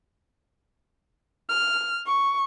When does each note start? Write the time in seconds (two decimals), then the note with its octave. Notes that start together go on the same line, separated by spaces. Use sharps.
1.49 F6
2.06 C#6